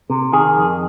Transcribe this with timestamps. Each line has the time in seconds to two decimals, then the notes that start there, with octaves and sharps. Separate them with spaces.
0.10 C3
0.32 D#3 G#4
0.56 F2